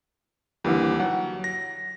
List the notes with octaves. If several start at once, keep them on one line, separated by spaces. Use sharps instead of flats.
D#2 D3 E3 G3
F#3 F#5
A#6